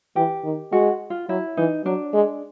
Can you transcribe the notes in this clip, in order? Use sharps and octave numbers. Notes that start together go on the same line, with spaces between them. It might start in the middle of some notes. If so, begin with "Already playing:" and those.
E3 G4
D#3
G#3 F#4
F4
F#3 E4
E3 D#4
F#3 D4
G#3